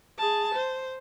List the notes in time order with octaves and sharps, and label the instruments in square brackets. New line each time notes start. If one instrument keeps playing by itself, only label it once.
[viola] G#4 A5
C5